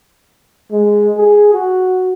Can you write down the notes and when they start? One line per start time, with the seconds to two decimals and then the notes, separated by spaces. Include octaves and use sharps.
0.72 G#3
1.18 G#4
1.54 F#4